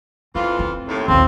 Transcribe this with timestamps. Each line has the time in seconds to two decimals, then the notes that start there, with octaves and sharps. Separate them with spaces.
0.35 F2 E3 C4 F4
0.59 C4
0.88 D#2 A2
1.08 A#1 D#2 F3 C4